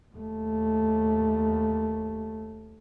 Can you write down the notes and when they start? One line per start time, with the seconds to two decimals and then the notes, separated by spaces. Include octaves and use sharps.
0.15 D#2 A3